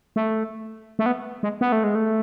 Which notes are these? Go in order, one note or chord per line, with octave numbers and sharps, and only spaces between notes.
A3
A3
B3
G#3
B3
A3
G#3
A3